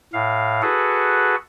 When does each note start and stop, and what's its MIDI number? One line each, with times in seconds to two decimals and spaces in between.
0.13 0.61 45
0.13 0.61 77
0.62 1.35 66
0.62 1.35 68
0.62 1.35 69
0.62 1.35 71
0.62 1.35 78